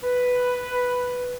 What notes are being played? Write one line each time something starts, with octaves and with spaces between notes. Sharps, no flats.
B4